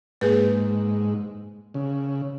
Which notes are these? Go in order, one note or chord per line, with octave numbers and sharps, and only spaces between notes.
G#2 A#3 G#4 B4
C#3